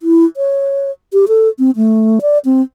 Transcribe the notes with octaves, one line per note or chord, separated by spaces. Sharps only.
E4
C#5
G4
A4
C4
A3
D5
C4